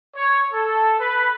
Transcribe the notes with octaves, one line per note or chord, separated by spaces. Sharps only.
C#5
A4
B4